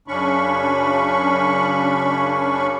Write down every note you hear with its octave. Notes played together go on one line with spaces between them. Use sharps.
F#2 C#3 C#4 D4 B5 C#6